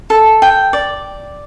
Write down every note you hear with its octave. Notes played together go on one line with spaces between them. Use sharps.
A4
G5
D5